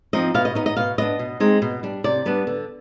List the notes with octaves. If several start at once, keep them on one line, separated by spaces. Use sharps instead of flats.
F3 C4 D#4 D#5
B2 F5
D#5
B3 D#4 D#5
D#5
B2 F5
B3 D4 D#5
B2
G#3 C4 D#4
B2
G3 D4
C3 D5
G3 B3 D4
D3